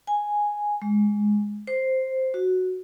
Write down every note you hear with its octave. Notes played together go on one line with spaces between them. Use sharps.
G#5
G#3
C5
F#4